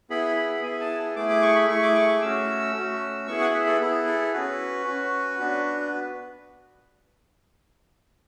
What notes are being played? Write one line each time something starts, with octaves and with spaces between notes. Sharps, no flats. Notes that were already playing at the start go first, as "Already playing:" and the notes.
B3 E4 G#4 B5
B5
B3 E4 G#4 G#5
A5
A3 E4 G#4 D6
D6
C#6
B5
A3 E4 G#4 C#6
D6
C#6
D6
A3 C#4 F#4 E6
A3 C#4 F#4
B3 E4 G#4 C#6
F#5
E5
A4
B3 E4 G#4
A4
C#4 F#4 B4
C#4 F#4
B3 D4 F#4